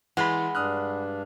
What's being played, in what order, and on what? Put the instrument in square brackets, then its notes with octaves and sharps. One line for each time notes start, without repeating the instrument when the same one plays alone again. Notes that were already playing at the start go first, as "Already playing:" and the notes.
[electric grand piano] E3 [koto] G#3 F4 [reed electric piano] F#5 B5
[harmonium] G2 D4 [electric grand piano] D#6 F6 F#6